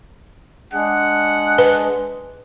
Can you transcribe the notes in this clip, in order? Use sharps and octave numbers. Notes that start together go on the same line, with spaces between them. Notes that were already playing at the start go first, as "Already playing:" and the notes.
G#3 D4 G#4 F#5
B4